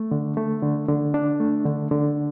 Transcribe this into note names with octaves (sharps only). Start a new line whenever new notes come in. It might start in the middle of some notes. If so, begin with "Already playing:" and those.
Already playing: A3
D3
A3
D3
D3
D4
A3
D3
D3